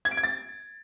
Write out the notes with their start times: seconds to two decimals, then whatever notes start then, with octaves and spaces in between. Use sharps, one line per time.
0.05 G#6
0.11 D7
0.17 G#6
0.23 A6